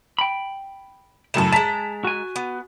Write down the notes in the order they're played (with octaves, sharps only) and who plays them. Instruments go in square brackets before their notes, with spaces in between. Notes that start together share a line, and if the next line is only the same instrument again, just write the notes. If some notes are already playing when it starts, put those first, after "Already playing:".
[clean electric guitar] G5 B5
[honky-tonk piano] F#2 A2 E7 [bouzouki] C#3 A5
[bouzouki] G#3 A#5 [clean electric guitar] A5 [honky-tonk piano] A6 B6
[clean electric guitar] F#4 G#5
[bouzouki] B3